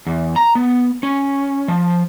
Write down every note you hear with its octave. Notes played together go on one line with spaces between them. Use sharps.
E2
A#5
B3
C#4
F3